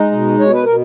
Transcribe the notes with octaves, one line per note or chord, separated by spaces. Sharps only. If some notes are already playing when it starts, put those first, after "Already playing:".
Already playing: G#3 D#4
B2
B2 C#5
B4
B2 A#4